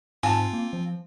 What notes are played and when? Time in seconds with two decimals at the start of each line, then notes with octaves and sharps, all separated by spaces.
0.23 G#2 C4 F4 G#5 A5
0.53 A#3
0.73 F3